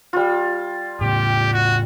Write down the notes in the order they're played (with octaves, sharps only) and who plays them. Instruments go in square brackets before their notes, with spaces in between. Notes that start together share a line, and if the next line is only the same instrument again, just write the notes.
[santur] G3 F4
[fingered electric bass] A2 C#3 [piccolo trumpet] G4
[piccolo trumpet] F#4